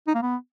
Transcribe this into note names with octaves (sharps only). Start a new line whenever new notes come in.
D#4
A#3
B3